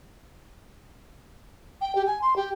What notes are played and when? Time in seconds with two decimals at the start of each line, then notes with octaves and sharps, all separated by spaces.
1.81 G5
1.95 G4
2.07 G#5
2.22 C6
2.36 G4